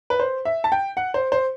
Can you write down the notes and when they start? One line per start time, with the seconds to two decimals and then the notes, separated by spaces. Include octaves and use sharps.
0.10 B4
0.20 C5
0.45 E5
0.64 A5
0.72 G5
0.97 F#5
1.14 C5
1.32 C5